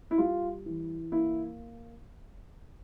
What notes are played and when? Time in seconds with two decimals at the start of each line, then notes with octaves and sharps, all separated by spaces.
0.11 E4
0.18 G3 F4
0.66 E3
1.12 A#3 E4